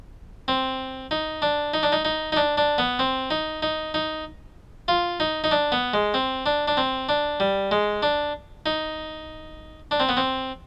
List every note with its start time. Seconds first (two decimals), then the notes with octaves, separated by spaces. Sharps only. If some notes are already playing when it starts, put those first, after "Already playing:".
0.48 C4
1.11 D#4
1.42 D4
1.74 D#4
1.83 D4
1.92 D#4
2.05 D#4
2.32 D#4
2.37 D4
2.57 D4
2.78 B3
2.99 C4
3.31 D#4
3.62 D#4
3.94 D#4
4.88 F4
5.20 D#4
5.44 D#4
5.51 D4
5.72 B3
5.94 G#3
6.14 C4
6.46 D4
6.68 D4
6.77 C4
7.09 D4
7.40 G3
7.71 G#3
8.03 D4
8.66 D#4
9.91 D4
10.00 C4
10.09 B3
10.17 C4